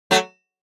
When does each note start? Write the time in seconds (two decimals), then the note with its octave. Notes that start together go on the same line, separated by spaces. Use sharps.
0.11 F#3 A3